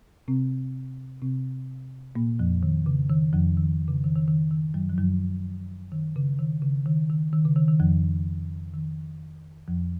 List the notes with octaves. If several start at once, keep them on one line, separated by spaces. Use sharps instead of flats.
C3 C4
C3 C4
A#2 A#3
F2 F3
D#3
C#3
D#3
F2 F3
D#3
C#3
D#3
D#3
D#3
D#3
F#2 F#3
F3
F#2 F#3
D#3
C#3
D#3
C#3
D#3
D#3
D#3
C#3
D#3
D#3
F2 F3
D#3
F2 F3